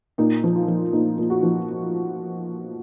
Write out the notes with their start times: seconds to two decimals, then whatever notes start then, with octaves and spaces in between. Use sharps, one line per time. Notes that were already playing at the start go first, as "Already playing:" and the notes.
0.18 A#2 D#4
0.44 F3
0.56 F4
0.68 F3
0.93 A#2 D#4
1.18 A#2
1.30 F#4
1.43 F3